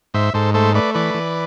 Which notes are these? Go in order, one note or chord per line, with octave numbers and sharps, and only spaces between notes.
G#2 C5 E5
G#2 A4 C5
A3 A4 C5
A3 B4 D5
E3 B4 D5
E3